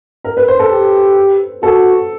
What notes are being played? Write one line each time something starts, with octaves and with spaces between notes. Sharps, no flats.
A#4
B4
C5
A4
G4
F#4 A4